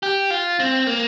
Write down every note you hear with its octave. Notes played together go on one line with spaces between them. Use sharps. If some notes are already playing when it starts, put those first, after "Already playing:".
G4
F4
C4
A#3